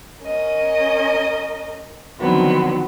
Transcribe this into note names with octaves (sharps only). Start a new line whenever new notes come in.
C#4 A#4 D#5
D3 D#3 F3 F#3 B3 C4